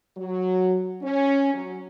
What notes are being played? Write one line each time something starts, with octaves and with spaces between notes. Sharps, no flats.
F#3
C#4
F#3